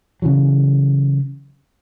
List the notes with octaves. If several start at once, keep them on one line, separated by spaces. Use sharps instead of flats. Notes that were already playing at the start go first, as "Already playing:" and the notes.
C#3 E3 F#3